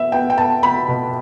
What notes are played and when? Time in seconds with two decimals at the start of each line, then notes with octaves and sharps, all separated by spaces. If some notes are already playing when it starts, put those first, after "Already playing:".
Already playing: B3 E5
0.12 B3 G5
0.30 G5
0.38 B3 A5
0.63 B3 B5
0.88 B2